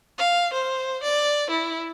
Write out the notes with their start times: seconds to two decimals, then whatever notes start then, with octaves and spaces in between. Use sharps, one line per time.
0.18 F5
0.53 C5
1.03 D5
1.50 E4